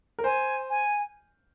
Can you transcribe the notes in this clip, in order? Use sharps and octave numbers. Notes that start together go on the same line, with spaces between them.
A#4
C5 G#5
G#5